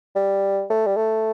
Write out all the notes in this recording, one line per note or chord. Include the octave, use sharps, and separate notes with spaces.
G3
A3
G3
A3